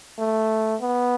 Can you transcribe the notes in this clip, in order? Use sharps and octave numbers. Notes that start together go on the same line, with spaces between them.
A3
B3